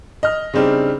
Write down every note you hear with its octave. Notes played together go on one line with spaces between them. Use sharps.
D#5 F6
C#3 G3 C4 D4 D#4